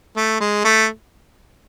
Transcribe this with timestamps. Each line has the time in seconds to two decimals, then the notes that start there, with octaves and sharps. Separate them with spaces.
0.16 A3
0.40 G#3
0.64 A3